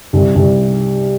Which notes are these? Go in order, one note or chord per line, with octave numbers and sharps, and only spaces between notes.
C2
C2